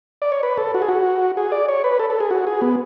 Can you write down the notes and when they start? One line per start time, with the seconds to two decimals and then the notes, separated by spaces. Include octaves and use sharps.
0.22 D5
0.32 C#5
0.43 B4
0.58 A4
0.74 F#4
0.82 G#4
0.89 F#4
1.37 G#4
1.52 D5
1.68 C#5
1.84 B4
1.99 A4
2.10 A4
2.20 G#4
2.31 F#4
2.47 G#4
2.61 B3